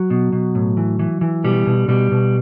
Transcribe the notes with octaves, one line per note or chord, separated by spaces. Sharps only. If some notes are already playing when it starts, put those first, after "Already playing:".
Already playing: F#3
B2
B2
A2
E3
E3
E3
B2 G3
B2
B2 G3
B2